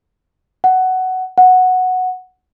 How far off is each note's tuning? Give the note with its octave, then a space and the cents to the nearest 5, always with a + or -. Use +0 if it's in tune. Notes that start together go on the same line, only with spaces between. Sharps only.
F#5 +10
F#5 -5